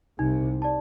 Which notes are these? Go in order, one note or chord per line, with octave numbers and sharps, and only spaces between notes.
C2 C3 D#4
D5 A5